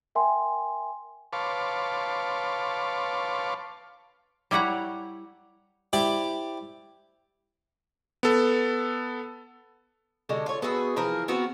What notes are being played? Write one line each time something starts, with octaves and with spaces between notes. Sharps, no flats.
A#4 E5 G5 G#5 C6
B4 C#5 F5 A5 C6 D6
G3 E4 C#5 F#5 A#5
E4 G4 C5 D5 G5 B5
B3 A4
D3 G#3 F#4 G4
F4 C#5
B3 F#4 G#4 E5
E3 F3 G#4 A#4
B3 C4 F#4